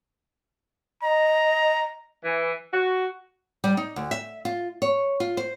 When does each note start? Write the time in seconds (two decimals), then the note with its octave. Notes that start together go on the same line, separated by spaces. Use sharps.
1.03 D#5 A#5
2.23 E3
2.72 F#4
3.64 G3
3.77 D#4
3.96 D2
4.11 E5
4.45 F4
4.82 C#5
5.20 F4
5.37 C5